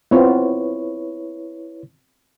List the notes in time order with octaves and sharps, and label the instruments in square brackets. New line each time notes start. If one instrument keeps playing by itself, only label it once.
[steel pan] B3 C4 F4 [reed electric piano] E4 B4 C#5